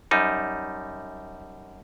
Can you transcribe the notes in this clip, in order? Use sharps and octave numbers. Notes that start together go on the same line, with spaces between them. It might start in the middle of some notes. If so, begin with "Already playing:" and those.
F#2 G3 D#4